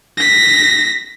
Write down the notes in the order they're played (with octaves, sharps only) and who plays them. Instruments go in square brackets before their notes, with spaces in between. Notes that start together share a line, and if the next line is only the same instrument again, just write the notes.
[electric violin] A#6 B6